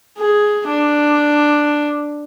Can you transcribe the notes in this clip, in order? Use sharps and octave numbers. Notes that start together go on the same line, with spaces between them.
G#4
D4